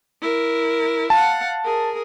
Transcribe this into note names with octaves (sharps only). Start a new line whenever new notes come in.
E4 A#4
F5 F#5 A5
G#4 A#4